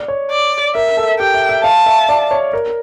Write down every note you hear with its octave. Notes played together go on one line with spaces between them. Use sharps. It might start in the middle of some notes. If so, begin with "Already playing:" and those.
Already playing: D5
C#5
D5
A#4 E5
A4
G4 G5
E5
E5
F5 A5
E5
D5
C#5
A#4